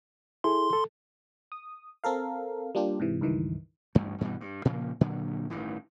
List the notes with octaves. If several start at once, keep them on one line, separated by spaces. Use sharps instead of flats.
E4 G#4 A4 C6
A4
D#6
C4 A4 A#4 F5
G3 A#3 D4 F4 G4
G#2 C3 E3
C#2 G2 D#3 E3
A1 D2 G2
G2 B2 E3 G3
G2
A#2 C#3 F3 A#3
A#2 D3 F#3
A1 G2 D#3 E3